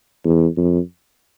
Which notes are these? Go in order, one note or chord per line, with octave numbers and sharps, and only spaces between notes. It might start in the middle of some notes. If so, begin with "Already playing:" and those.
E2
F2